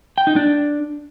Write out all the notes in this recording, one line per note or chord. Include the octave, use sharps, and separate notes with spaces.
G5
D#4
D4